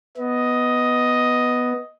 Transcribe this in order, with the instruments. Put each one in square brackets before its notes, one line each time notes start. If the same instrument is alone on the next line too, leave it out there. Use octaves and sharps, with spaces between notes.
[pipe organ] B3 [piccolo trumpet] D#5